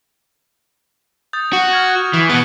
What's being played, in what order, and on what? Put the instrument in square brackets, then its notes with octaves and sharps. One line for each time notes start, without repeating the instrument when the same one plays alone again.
[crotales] D#6 G6 A6
[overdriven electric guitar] F#4 [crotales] C#6
[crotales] F6 G#6
F#6
[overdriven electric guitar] E3
[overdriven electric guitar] B2 B3 [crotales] F#6 C#7 G7